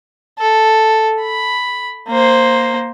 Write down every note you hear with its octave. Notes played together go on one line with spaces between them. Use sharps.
A4
B5
A#3 C5